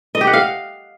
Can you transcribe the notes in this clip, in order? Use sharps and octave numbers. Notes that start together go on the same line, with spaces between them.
D#5
G4
F#5
F5